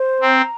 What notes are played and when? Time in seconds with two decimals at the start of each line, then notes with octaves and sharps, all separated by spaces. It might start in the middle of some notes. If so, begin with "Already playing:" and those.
Already playing: C5
0.21 C4 A#5